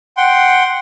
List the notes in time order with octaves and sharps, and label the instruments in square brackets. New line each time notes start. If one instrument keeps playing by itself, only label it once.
[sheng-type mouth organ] F#5 G5 C6